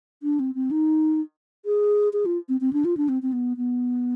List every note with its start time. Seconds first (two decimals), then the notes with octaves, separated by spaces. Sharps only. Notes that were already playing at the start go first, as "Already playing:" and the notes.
0.23 D4
0.40 C4
0.55 C4
0.71 D#4
1.66 G#4
2.13 G#4
2.26 F4
2.49 C4
2.61 C4
2.73 D4
2.85 F4
2.97 D4
3.09 C4
3.23 C4
3.33 B3
3.57 B3